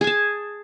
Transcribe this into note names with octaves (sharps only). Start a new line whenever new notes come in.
G#4 G#5 A5